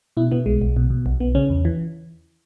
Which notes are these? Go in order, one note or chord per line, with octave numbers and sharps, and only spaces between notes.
B2 E4
B2 B3
B1 G#3
B1
B2
B2
B1
B1 B3
C#3 C#4
E2
E3